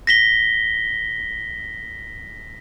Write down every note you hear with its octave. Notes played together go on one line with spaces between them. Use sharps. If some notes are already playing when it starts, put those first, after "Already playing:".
A#6 B6 G7